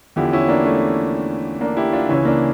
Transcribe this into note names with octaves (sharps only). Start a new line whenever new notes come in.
E2 D3 F3 E4 G4
C#4 E4
A#3 D4
A3 C#4
A#3 D4
E4 G4
D4 F4
C#2 C#3 E3 C#4 E4
A#3 D4